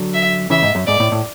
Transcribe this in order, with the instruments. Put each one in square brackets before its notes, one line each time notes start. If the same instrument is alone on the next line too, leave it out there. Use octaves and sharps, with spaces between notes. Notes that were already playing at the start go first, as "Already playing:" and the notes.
Already playing: [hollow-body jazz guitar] D3 F#3
[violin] E5
[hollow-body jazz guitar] C#3 E3 [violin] E5
[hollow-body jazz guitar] G#2
F#2
[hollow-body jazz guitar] G#2 [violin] D5
[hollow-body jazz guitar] A2
A2